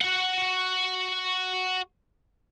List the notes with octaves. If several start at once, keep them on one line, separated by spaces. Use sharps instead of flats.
F#4 F#5